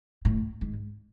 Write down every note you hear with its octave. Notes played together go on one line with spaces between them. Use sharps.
A2
G#2